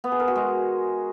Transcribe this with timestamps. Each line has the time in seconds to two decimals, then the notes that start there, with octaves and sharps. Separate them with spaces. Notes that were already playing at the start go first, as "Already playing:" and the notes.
0.04 B3
0.12 G#4
0.20 A#4
0.28 F#4
0.36 G#3